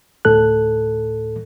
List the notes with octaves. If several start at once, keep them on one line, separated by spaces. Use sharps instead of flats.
D2 A2 A4 F#6